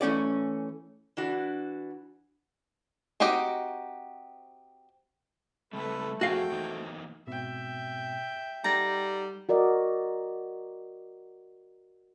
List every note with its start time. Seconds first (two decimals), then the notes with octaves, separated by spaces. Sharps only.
0.01 E3 A3 C#4 D5
1.17 E3 D4 F#4
3.20 C4 D#4 F#4 G4 D#5
5.73 C#3 G3 A3 C4 A4 B4 B5
6.21 F2 C4 F#4 G#4 F5 G5
6.52 E3 A#3 D#4
7.27 G#2 B2 C4 E5 G5
8.64 G3 D#4 A4 F#5 A#5
9.49 F#4 A#4 D5 D#5